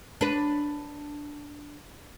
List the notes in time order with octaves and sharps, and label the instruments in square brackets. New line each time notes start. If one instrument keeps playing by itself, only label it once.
[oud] D4 B4